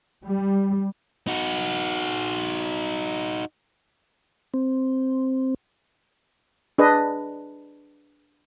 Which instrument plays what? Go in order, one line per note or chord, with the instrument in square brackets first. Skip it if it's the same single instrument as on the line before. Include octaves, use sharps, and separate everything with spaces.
[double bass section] G3
[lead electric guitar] D#4 F#4
[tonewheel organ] C4
[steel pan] D4 G#4 B4 D#5